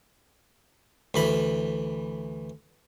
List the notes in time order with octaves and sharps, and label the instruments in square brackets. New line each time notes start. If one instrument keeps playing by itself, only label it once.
[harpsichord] D2 E3 B5